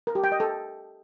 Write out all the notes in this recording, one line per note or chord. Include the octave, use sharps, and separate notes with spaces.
A#4
G4
G5
D#5
A4